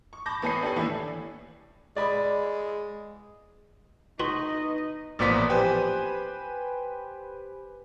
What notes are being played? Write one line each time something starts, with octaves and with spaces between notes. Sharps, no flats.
C#6
A5 B5 D6 G6 A#6
A1 B3 C#5 G#5 B5 C7
D4 G4 A4 C#5 G#5
D#2 A2 E3 E4 A4 D5
G#3 D5 B5
D#4 F#4 B4 D#5 C6
A1 A#2 F3 B3 D5 B6
G4 B4 C5 G#5